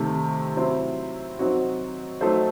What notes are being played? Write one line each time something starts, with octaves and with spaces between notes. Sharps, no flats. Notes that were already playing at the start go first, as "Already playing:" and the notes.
Already playing: C3 D#3 A3
F#3 C4 E4 C5
F#3 C4 D#4 F#4
F#3 A3 D#4 A4 C5